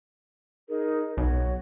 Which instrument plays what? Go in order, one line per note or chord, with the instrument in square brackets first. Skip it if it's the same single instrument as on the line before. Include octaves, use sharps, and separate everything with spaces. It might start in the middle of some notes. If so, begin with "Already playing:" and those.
[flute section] D#4 G#4 A#4
[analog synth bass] B1 [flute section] F#4 C#5